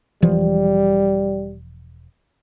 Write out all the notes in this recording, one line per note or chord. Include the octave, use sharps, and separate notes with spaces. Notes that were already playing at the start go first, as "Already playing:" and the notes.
E1 E3 F3 G3